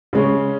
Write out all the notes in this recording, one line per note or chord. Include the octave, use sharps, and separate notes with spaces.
C#3 G#3 C#4